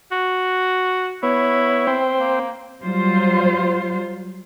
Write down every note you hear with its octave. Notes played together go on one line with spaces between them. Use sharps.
F#4
B3 E4 C#5
C4 C5 G5
A#3
F#3 G3 F4 C5